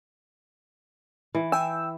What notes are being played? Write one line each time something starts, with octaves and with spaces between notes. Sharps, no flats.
E3
G5 G#5 E6